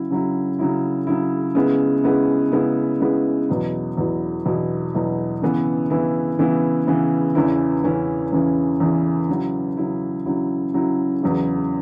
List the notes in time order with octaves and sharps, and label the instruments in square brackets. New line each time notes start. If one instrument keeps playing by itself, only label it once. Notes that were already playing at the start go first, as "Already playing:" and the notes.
Already playing: [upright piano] C#3 F#3 E4
C#3 F#3 E4
C#3 F#3 E4
C#3 F#3 E4
C#3 G#3 B3 E4
C#3 G#3 B3 E4
C#3 G#3 B3 E4
C#3 G#3 B3 E4
E2 B2 F#3 E4
E2 B2 F#3 E4
E2 B2 F#3 E4
E2 B2 F#3 E4
C#3 E3 B3 E4
C#3 E3 B3 E4
C#3 E3 B3 E4
C#3 E3 B3 E4
E2 C#3 E3 C#4 E4
E2 C#3 E3 C#4 E4
E2 C#3 E3 C#4 E4
E2 C#3 E3 C#4 E4
C#3 F#3 E4
C#3 F#3 E4
C#3 F#3 E4
C#3 F#3 E4
E2 C#3 F#3 E4